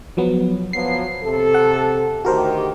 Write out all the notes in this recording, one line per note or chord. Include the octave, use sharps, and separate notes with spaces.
F3 F#3 B3
F3 F#3 B3 C7
C3 A4
F#5
D2 D#3 F#4 G4 A#4 C5